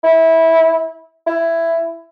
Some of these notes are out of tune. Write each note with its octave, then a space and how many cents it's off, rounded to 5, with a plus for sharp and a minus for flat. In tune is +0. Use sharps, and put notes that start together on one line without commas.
E4 -20
E4 +10